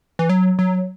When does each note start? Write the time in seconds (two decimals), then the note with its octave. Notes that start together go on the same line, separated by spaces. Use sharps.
0.19 E3
0.29 F#3
0.59 F#3